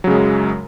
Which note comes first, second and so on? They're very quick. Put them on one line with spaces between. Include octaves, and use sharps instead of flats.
F#3 C#3 G#3 F#2